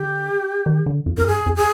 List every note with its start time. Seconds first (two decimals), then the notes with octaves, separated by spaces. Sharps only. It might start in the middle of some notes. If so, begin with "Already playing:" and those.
Already playing: D3 G4
0.66 D#3
0.86 D3
1.06 F2
1.17 F2 A#4
1.27 G2 G#4
1.46 F2
1.56 G#4